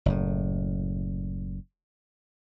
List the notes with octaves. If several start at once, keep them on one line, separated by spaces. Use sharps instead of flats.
F#1 A2